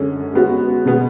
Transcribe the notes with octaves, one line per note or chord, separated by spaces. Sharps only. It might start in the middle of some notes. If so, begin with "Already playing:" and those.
Already playing: F#2 D3 G#3 C#4
G#3 B3 F#4
B2 G#3 B3